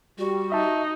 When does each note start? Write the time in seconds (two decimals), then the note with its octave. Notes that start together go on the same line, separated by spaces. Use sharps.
0.18 G3 F#4
0.52 D#4 E5 A5